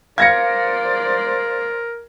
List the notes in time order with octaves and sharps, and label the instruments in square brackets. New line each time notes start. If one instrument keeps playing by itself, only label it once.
[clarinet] A#4 [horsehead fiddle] C5 D5 [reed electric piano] F5 [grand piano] G#6 A#6 C#7